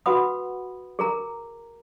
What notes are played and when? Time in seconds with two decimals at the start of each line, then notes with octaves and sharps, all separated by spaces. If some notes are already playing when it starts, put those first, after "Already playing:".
0.06 F#4 B4 F#5 B5 D#6
0.99 G#4 A#4 A#5